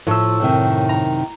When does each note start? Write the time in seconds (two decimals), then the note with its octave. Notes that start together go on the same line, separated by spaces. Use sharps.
0.07 A2 F3 E6
0.40 F#2 C3 D#3
0.89 A#5